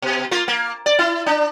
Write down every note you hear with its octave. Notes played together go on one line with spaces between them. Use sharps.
B2
A#3 F4
A#3
D5
E4
D4